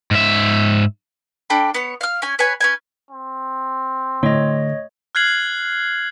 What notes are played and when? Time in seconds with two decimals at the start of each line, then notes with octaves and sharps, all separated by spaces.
0.11 G#2 E5
1.50 D4 A4 G5 B5
1.74 B3 C#5
2.01 F5 F6
2.22 C#4 G#5
2.39 B4 C#5 G#5
2.61 C#4 B4 G#5
3.11 C4
4.23 A2 D3 C#5 D#5
5.15 F6 F#6 G#6 C7 F#7